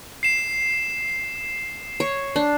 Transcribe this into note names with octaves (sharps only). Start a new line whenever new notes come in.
C7 E7
C#5
D4